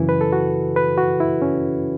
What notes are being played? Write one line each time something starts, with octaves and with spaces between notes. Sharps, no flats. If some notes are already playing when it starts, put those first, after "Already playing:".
Already playing: F#2 C#3 E3 E4
B4
A4
F#4
B4
F#4
E4
C#4